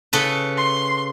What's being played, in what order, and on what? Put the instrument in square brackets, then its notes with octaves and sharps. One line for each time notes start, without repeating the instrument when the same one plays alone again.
[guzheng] C#3 A4 B4
[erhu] C6